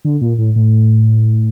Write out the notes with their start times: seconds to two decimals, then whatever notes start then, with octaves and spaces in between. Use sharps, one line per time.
0.05 D3
0.21 A#2
0.38 A2
0.56 A2